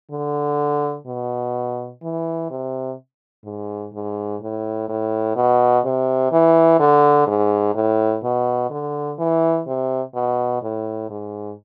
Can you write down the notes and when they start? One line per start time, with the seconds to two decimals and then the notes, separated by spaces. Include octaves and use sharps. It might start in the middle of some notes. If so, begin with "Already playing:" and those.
0.11 D3
1.06 B2
2.03 E3
2.50 C3
3.45 G#2
3.93 G#2
4.41 A2
4.89 A2
5.36 B2
5.85 C3
6.32 E3
6.80 D3
7.27 G#2
7.75 A2
8.24 B2
8.70 D3
9.19 E3
9.67 C3
10.15 B2
10.63 A2
11.10 G#2